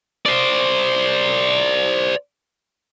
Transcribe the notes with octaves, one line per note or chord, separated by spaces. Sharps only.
C5 D5